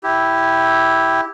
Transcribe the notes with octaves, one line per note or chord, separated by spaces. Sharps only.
E4 G4